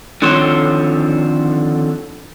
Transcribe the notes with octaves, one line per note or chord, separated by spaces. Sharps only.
D3 D#3 F3 C4 C5 C#5